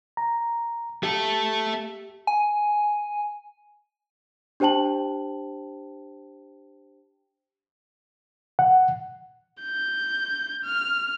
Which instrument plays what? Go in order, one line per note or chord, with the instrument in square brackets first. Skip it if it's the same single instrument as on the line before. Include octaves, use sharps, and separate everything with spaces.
[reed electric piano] A#5
[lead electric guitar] A3 A4 [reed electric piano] G4
[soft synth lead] G#5
[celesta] D4 G4 C5 G5 A5 F#7
[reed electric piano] F#5
[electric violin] G6
F6